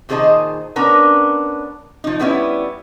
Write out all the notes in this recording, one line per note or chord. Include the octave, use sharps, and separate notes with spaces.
A#2 D#3 G#4 C5 D#5 A5
B3 C#4 D4 A#4
F3 D#4
G3 B3 C#4 E4